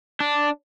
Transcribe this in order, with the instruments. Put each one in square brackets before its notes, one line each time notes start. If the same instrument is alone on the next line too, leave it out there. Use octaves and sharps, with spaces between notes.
[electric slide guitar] D4